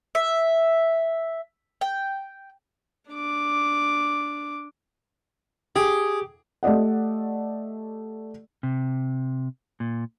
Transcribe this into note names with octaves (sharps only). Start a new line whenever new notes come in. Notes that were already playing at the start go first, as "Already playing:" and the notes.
E5
G5
D4 D6
G4 G#4
A3 G4 D5 D#5 F#5
C3
A#2